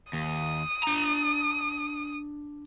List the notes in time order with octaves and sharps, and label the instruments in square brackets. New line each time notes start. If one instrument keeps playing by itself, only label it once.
[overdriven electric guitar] D#2 [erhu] D#6
[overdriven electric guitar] D4 A#5